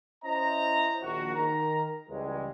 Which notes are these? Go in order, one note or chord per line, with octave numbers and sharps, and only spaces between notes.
C#4 E4 C5 D#5 E5 A#5
A#1 D#3 F#4
D#3 A#4 A#5
C#2 E3 G3 G#3